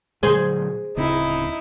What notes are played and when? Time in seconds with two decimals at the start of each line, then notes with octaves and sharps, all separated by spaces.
0.23 A#2 D3 F#3 G#4 C5
0.97 D1 C#3 C4 D#4 E4